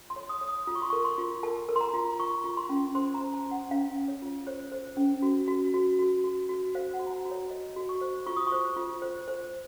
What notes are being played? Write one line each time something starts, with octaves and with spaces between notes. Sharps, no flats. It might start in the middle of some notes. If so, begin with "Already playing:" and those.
Already playing: F4
C6
C#5
D#6
C#5
D#6
F4 D#6
C#6
C6
A#4 C#6
C6
F4
A#4 A5
A#4
C6
A#5
F4
F4 C#6
F4
C6
C#4
C5 C6
A#5
C5
A5
C#4
F#5
C#4 F5
C#4
C#5
F4
C5 C#5
C5
C#4
F#4
F#4
F#4
F#4
F#4
F#4
C5 F5
F#5
F#4
A#5
A5
F#4
C#5
C5 D#5
F#4
C#6
C5
F4 C#6
D#6
C#6
C5
F4
C5
C5